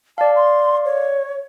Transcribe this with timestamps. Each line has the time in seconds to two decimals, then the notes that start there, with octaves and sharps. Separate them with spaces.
0.18 D5 F5 A5
0.36 C6
0.85 C#5